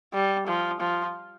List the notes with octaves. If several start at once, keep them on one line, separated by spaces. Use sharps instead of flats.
G3
F3
F3